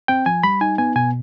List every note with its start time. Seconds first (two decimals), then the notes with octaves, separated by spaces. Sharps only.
0.08 C4 G5
0.26 F3 G#5
0.43 G3 B5
0.61 D#4 G#5
0.78 B3 G#5
0.96 B2 G#5